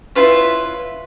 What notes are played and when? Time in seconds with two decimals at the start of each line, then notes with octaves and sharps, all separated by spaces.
0.15 E4 F4 B4 C#5